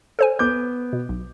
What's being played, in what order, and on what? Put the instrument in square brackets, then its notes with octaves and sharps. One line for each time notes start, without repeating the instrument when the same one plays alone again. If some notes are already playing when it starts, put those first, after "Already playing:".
[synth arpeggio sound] A4 C5 G#5
[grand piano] B3 D6 G6
[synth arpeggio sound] B2
B1